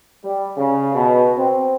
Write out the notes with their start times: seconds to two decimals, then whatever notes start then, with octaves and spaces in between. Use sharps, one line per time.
0.24 G3
0.57 C#3
0.94 B2
1.36 C4